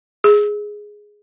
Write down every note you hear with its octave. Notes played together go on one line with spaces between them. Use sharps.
G#4